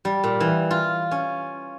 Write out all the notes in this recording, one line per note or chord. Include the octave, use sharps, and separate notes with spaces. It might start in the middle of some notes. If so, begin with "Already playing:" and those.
G3
A#2
E3
F4
C#4